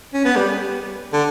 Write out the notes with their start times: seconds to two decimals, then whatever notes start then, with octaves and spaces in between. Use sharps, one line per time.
0.14 C#4
0.25 B3
0.36 G3
1.13 D3